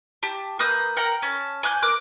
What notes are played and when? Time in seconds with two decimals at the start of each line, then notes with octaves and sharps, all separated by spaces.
0.23 G4 A5
0.59 A#3 B4 D#6 G6
0.96 A#4 F#5 G5 A#5
1.22 C#4 A5
1.63 G#5 D6 F#6 G6
1.82 A#4 D6 F#6